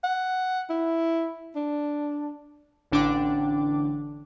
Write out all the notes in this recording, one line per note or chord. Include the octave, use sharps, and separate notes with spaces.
F#5
E4
D4
A1 D3 D4 G5 D6